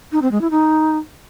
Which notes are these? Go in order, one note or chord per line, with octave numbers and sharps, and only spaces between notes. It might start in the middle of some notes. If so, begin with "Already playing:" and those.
D#4
C4
G#3
E4
D#4